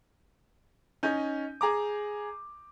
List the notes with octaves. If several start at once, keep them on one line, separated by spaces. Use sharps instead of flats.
C#4 D#4 G#5 G6
G#4 A#5 D6